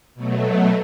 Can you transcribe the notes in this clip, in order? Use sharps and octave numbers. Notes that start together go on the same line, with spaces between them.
B2 F#3 A3